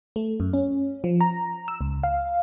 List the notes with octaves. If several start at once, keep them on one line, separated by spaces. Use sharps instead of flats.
A3
F#2
C#4
F3
A#5
E6
C#2
F5